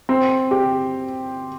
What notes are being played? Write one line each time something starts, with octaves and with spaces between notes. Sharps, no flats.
C4
G4